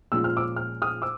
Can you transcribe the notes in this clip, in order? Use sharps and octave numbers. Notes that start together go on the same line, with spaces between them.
A#2 F3 G#3 C#4 F4 E6
F6
D6 E6
F6
D#6 F6
D6 E6